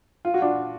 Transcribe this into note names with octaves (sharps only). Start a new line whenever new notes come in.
F4
F#4
D4 F4